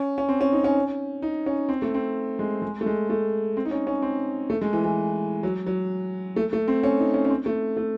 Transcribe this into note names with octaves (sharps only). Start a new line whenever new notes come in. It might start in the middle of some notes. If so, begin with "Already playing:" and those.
Already playing: C#4
C#4
C4
C#4
D#4
C#4
D#4
C#4
C4
A3
C4
G#3
G#3
A3
G#3
A3
C4
D#4
C#4
C#4
C4
A3
G#3
E3
E3
F#3
F#3
A3
A3
C4
C#4
D#4
C#4
C#4
C4
A3
A3